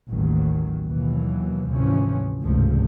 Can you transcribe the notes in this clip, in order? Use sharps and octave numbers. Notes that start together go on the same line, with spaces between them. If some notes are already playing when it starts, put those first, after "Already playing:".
A1 D#2 D#3 F#3
D#2 B2 E3 F#3
G#1 D2 C3 E3 F3 C#4
G#1 C#2 G2 C3 F3 A3